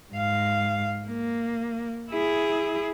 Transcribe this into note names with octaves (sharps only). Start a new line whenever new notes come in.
G#2 F5
A#3
E4 G#4